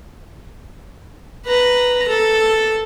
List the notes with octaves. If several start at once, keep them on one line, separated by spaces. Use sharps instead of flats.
B4 A#5
A4